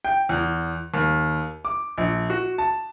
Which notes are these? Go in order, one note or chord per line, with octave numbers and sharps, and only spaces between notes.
G5
E2
D#2
D6
A#1
F#4
A5